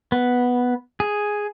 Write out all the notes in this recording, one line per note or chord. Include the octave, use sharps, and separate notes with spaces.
B3
G#4